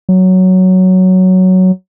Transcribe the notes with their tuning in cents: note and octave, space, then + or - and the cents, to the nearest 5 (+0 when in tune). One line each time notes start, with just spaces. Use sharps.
F#3 +5